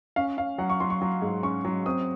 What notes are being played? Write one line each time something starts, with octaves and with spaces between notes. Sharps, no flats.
C#4 F5
C#4 F5
F#3 F#5
C#6
F#3 C6
C#6
F#3
G#2
C#4 C#6
F#3
C4 D#6